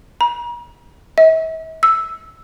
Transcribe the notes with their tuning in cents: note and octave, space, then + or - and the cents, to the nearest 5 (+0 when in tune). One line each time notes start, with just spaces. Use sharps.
A#5 +45
E5 -45
E6 +0